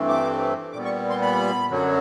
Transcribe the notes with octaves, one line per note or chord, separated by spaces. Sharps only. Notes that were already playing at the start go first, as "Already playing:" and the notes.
Already playing: G2 E3 A3 C4
D6
A#2 G3 B3 D6
C#6
C6
B5
F#2 D3 F#3